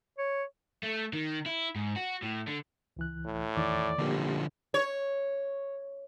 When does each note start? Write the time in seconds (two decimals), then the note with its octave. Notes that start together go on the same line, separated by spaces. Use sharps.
0.18 C#5
0.83 A3
1.13 D#3
1.46 E4
1.75 G#2
1.96 F#4
2.22 A2
2.47 D3
2.97 C#2 E3 F#6
3.25 A2
3.56 E2 D#3 E3 D5
3.99 A1 D3 F3 A#3 G4
4.74 C#5